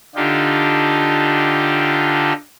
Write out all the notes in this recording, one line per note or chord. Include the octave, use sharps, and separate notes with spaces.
D3 D4 D#4 F4 G4